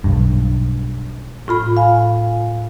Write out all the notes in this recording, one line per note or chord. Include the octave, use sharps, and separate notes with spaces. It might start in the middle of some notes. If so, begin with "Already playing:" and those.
B1 G2
A2 F4 B5
F5 G#5